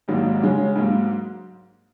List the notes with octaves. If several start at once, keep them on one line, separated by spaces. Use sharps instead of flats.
G#1 G#2 F#3 A#3 D#4
C#3 G#3 C#4
G#2 F#3 A#3